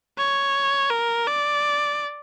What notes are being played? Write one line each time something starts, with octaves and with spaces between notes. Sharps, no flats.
C#5
A#4
D5